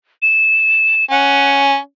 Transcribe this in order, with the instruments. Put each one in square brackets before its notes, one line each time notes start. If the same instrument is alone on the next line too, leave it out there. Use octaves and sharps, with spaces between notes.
[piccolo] E7
[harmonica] C#4 [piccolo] F#5